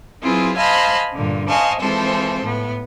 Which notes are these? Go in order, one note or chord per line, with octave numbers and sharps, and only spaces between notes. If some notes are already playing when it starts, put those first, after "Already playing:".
F#3 C4 E4 F4 G#4 B4
C5 D#5 F5 G#5 A5 B5
G2 A#2 D3
C5 D#5 F5 G#5 A5 C#6
E3 F3 G#3 C4 A4 C5
A2 B3